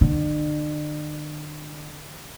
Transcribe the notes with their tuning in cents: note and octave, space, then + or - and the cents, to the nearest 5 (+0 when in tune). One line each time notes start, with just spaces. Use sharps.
D3 +40